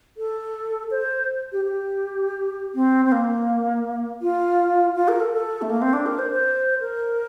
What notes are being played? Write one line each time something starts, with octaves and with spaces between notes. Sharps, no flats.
A4
C5
G4
G4
C4
C4
A#3
F4
F4
A#4
A4
A4
A3
A#3
C4
D4
A#4
C5
C5
A#4